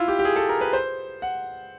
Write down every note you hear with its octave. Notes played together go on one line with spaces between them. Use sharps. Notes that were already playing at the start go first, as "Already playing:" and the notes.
Already playing: E4 F4
G4
G4
G#4
A4
A#4
B4
C5
F#5